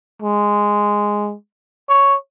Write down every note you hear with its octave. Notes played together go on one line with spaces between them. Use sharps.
G#3
C#5